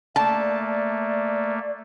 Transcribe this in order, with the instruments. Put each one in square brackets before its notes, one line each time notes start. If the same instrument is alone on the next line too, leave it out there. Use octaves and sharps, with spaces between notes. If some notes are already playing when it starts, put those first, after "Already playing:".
[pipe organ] A3 A#3 [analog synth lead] D5 [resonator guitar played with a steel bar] A5